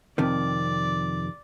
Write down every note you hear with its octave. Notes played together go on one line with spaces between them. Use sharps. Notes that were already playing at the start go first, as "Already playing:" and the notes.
F2 C3 D#3 D5